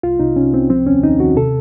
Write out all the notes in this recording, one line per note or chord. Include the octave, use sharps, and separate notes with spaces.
C2 F4
C2 D#4
C3 C#4
C2 C4
F3 C4
D#2 C#4
D#2 D#4
D#2 F#4
C3 A4